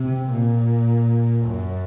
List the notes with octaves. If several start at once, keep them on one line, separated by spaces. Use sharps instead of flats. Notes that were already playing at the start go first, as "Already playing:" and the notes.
Already playing: C3
A#2
F#2